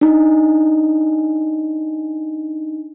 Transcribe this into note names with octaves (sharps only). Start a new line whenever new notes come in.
D4 D#4